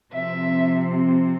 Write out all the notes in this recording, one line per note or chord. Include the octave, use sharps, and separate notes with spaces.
C3 F3 C4 E5